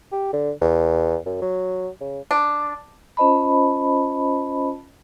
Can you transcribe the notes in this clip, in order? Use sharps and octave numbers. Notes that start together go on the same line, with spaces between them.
G4
D3
E2
F#2
F#3
C#3
D4
C#4 F4 C5 D#5 A5 B5